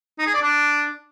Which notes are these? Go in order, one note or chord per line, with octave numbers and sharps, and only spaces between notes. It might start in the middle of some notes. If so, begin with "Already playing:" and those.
D#4
G#4
D5
D4